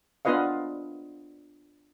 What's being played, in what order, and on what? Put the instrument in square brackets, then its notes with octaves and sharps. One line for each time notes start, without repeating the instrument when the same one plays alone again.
[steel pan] B3 D4 F4 B4 D#5 F5